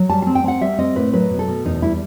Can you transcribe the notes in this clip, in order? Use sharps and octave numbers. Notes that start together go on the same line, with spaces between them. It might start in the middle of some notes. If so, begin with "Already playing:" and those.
Already playing: F#3
G3 A5
C4 A5
G5
C4 F#5
G3 E5
C4 D#5
A2 B4
F#3 B4
B2
A4
B2
E2 D#4
G3 E4